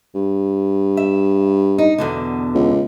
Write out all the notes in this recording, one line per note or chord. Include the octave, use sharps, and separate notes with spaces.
G2
E5
D#4
E2 B2 D3
C#2